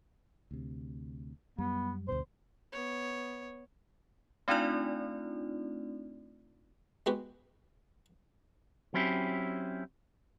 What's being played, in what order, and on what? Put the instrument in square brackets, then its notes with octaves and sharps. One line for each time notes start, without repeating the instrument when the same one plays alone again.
[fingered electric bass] D2 C3
[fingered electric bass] F#2 G3 [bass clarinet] B3
[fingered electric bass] D2 G2 B2 [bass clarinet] C5
[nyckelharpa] B3 C#5
[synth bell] A3 C4 D4 D#4 F4 D5
[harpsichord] G#3 B3 F#4 G4
[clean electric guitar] F#3 C4 C#4 E4 G4